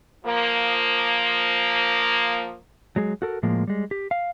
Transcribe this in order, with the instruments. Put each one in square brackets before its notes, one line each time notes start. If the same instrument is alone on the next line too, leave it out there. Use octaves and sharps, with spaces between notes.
[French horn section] F3 A#3
[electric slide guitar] F#3 G#3 G#4
F#4 A4 A#4
A2 F3 G#3 A#3
G3 G#3
G4
F5